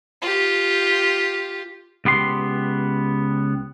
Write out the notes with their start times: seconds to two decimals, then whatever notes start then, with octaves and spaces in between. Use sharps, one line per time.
0.22 F4 G4
2.05 C#2 B3 G4 C6